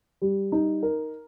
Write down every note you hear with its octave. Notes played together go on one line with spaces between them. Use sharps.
G3
D#4
A#4